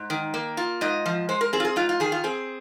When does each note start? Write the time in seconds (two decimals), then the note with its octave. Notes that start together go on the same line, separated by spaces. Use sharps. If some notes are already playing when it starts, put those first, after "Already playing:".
Already playing: G#2
0.10 D#3
0.34 A#3
0.57 F4
0.81 G#2 D#5
1.06 F3
1.29 G#3 C5
1.41 A#4
1.53 C4 G#4
1.60 F4
1.65 G#4
1.76 G#2 F4
1.89 F4
2.00 D#3 G#4
2.12 F4
2.24 C4 G#4